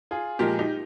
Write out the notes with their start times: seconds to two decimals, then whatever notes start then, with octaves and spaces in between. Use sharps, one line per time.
0.11 F4 G#4
0.39 A#2 F3 G#3 G4 A#4
0.59 D#4 G4